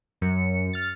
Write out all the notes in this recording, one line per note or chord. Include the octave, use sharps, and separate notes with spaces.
F#2 C#7
F6 A6